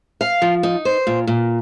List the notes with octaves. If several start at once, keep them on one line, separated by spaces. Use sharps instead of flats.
F5
F3
D#4
C5
A#2
A#2